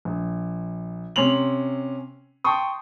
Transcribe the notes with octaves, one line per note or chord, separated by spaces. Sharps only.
A#1
C3 C#4 C6 F7 F#7
G5 A5 C6 C#6 D#6